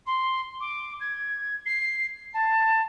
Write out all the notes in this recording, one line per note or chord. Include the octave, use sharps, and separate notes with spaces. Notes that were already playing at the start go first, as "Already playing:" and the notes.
C6
D6
G#6
C7
A5